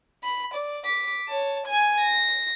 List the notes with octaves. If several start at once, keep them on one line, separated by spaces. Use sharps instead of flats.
B5
D5
D6 B6
C#5 A5
G#5 G#6
A#6